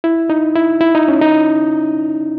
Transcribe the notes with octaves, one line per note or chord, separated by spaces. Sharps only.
E4
D#4
E4
E4
D#4
C#4
D#4